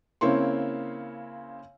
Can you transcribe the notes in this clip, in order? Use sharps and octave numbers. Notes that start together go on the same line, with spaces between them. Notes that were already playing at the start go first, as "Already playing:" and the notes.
C#3 A#3 C4 E4 C#5 C6